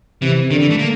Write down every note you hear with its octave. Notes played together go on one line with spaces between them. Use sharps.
C3 E3
D3 D#3
E3
A3
A#3